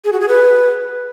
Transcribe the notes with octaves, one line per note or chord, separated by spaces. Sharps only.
G#4
F#4
G#4
B4